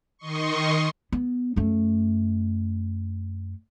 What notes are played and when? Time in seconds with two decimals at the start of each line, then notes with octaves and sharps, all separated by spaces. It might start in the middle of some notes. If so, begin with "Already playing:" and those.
0.18 D#3 D#5 C6 C#6
1.12 B3
1.56 F#2 A3